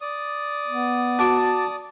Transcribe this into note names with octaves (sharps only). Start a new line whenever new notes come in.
D5 D#6
B3
F#4 A5 D6